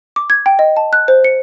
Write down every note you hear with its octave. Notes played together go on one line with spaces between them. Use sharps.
D6
G#6
G5
D#5
A5
F#6
C5
C#7